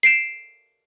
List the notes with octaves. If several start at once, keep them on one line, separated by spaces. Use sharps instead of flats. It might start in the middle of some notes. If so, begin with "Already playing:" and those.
C7 D7 E7